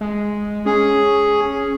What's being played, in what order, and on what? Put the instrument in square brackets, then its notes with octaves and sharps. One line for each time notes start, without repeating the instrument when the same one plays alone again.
[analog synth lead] G#3
[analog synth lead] C#4 [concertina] G#4